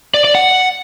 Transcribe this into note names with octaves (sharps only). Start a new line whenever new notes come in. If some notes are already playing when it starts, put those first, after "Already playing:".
D5
D5
F#5